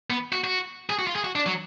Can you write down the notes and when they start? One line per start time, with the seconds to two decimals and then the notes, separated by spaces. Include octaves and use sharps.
0.10 B3
0.32 F#4
0.44 F#4
0.90 G#4
0.99 F#4
1.07 F4
1.16 G#4
1.24 F#4
1.35 D4
1.46 F#3